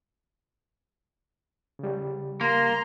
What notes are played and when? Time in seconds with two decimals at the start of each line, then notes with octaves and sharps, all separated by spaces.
1.79 C#3 G3
2.41 A#3 A#5 C6